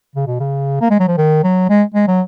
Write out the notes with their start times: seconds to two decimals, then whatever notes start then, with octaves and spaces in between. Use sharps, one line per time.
0.15 C#3
0.27 B2
0.40 C#3
0.81 A#3
0.90 G#3
1.00 F#3
1.08 F3
1.17 D#3
1.43 F#3
1.69 G#3
1.94 G#3
2.08 F#3